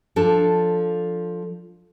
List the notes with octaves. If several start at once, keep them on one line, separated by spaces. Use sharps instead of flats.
F3 D4 A4